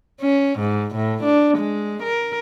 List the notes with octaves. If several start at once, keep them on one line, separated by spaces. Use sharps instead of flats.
C#4
G#2
A2
D4
G#3
A#4